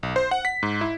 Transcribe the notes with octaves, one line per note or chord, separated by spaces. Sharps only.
B1
C5
F#5
B6
G#2
E4